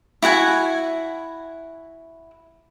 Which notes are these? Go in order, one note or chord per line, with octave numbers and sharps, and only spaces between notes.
E4 F#4 F#5 G#5